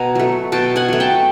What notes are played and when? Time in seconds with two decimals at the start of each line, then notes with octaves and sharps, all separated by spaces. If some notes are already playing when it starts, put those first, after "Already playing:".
Already playing: B2 G#5 A#5
0.15 F#3 A3
0.52 B2 G5 A5
0.76 F#5 G#5
0.88 F#3 A3
1.00 G5 A5